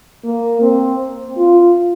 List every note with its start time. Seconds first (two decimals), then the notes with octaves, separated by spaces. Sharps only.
0.24 A#3
0.62 C4
1.37 F4